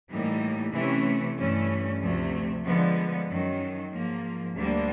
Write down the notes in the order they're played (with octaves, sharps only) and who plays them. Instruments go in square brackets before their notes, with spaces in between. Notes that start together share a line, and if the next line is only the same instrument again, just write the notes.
[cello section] A2 E3 G3 A#3 D#4
C3 E3 A3 C#4
G2 E3 A3 C#4
D2 C3 F3 A3
D3 F3 G#3 B3
F#2 D#3 F#3
G#2 F3 A#3
D2 D3 G3 A#3 D4